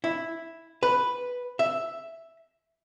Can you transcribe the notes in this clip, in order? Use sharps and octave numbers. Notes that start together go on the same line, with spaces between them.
E4
B4
E5